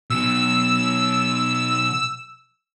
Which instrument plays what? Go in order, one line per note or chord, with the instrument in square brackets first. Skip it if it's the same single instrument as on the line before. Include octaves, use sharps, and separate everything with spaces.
[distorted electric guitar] B2 F#3 [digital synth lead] E6